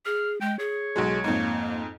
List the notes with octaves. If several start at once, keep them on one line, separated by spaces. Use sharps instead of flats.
G#4 F6
G#3 G5
G#4 C#5
B1 F#3 G#3
F2 G#2 A#3